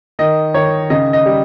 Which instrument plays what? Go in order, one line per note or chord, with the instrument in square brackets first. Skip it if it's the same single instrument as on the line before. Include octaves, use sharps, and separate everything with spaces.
[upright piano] D#3 D#5
D#3 C#5
C#3 D#5
D#5
G3